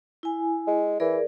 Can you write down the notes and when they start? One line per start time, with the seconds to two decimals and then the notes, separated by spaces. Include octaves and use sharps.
0.23 E4 G#5
0.67 G#3
1.00 E3 G#4 A#4 D5